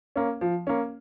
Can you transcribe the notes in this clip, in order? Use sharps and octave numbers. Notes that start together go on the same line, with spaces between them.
A#3 C#4
F3
A#3 C#4